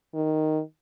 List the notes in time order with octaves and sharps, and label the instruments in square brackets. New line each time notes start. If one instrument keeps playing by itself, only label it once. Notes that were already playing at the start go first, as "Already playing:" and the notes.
[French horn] D#3